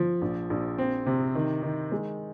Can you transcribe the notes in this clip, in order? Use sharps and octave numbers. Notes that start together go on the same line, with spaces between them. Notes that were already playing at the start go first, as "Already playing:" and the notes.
Already playing: F3
A#1
A#1
C4
C3
D#3
D#3
G#3